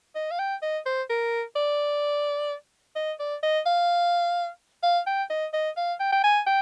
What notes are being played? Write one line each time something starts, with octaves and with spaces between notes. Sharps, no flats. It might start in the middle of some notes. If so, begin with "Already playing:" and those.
D#5
F5
G5
D#5
C5
A#4
D5
D#5
D5
D#5
F5
F5
G5
D#5
D#5
F5
G5
G5
G#5
G5